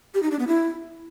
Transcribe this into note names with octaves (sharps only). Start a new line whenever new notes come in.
G4
D#4
D4
B3
E4